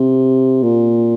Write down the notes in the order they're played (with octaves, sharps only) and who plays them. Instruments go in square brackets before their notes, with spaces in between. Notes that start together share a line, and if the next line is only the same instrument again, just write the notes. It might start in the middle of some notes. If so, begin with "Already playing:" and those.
Already playing: [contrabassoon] C3
A#2